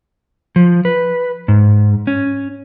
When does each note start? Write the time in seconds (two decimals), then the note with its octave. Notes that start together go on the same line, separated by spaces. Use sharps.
0.56 F3
0.85 B4
1.48 G#2
2.07 C#4